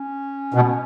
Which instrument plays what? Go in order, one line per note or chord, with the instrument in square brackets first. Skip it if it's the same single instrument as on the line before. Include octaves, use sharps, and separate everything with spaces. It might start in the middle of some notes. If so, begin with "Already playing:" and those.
Already playing: [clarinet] C#4
[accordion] B2